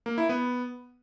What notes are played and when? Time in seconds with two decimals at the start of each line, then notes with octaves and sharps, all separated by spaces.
0.06 A#3
0.18 E4
0.29 B3